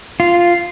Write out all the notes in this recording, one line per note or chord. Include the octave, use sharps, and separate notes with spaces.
F4